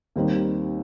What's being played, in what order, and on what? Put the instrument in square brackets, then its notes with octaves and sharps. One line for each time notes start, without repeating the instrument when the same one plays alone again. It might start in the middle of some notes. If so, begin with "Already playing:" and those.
[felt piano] D#2 D#3 G3 C4 D#4